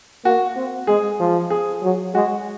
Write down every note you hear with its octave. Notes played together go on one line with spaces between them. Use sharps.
A#3 F#4
C4
G#3 G#4
F3
G#4
F#3
G#3 F#4